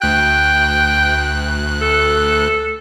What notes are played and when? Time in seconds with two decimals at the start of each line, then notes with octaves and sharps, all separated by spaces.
0.02 D2 G5 F#6
1.81 A4